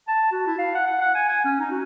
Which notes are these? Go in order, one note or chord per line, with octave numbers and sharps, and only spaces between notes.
A5
F#4
E4
F5
F#5
F#5
F#5
G#5
G#5
C#4
D#4
F#4